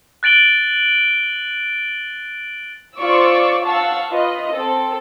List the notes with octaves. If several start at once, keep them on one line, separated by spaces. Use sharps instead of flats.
F#6 A6 D7 F#7 G7
F4 C5 D5 C#6 D6 E6
F5 F#5 A5 C#6 E6
F4 B4 D#5
C4 A4